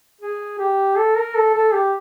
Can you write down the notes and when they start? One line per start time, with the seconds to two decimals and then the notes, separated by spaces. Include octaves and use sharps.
0.21 G#4
0.59 G4
0.97 A4
1.16 A#4
1.35 A4
1.54 A4
1.73 G4